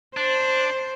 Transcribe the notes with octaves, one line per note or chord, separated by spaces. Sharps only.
D4 C5